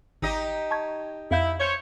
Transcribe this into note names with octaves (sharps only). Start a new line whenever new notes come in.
G#1 D#4 G4 D#5
A5 C#6 G#6
F2 E4 F5 G6
C5 C#5